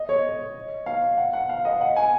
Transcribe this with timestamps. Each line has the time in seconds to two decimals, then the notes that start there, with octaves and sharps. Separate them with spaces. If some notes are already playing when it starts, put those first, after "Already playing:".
Already playing: D#5
0.09 C#5
0.86 F5
1.18 F#5
1.33 F#5
1.49 F5
1.65 D#5
1.81 F#5
1.96 G#5